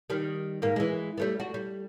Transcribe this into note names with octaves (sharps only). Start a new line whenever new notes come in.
D#3 G3
G#2 A#3
E3 G#3
G3 A3 B3
D4 F#4
G3